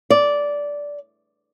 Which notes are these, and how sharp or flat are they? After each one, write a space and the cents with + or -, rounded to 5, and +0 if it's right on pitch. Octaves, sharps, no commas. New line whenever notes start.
D5 -10